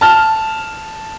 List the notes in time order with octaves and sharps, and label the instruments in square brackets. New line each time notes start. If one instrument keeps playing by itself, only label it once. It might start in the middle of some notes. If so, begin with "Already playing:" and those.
[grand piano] A5 F6